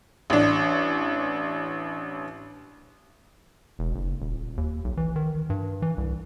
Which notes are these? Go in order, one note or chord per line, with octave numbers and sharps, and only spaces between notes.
A1 D4
E1
F#1
D#1
D#2
B1
E3
D#3
G2
E3
C2